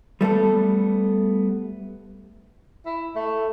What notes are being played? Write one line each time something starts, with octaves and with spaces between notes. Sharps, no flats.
G3 A3 B3 A4
E4
A3